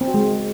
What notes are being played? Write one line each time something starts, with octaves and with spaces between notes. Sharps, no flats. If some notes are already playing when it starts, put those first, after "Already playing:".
C4
F#4
G#3